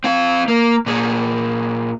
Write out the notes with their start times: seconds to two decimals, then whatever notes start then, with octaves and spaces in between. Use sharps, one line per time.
0.04 C4 F5
0.48 A#3
0.86 A#2 G#4